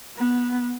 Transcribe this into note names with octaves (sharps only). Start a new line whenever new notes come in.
B3